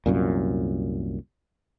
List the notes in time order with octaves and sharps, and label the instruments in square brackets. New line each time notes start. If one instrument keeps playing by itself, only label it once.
[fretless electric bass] C2 F#2 A#2